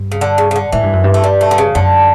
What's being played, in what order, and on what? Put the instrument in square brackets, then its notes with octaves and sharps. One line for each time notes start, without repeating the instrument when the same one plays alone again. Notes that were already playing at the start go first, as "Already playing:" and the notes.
Already playing: [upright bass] G2
[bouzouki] C#3
D3
C#3
C#3
D3
[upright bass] A2 [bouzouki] E3
[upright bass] G2
F#2
G2
[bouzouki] A3
G3
A3
D3
C#3
[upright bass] F#2 [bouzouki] D3